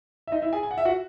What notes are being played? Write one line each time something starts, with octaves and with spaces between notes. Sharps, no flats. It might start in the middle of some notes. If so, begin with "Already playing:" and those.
E5
D#4 D#5
E4 E5
G#4 G#5
G#5
F#5
E5
F#4 F#5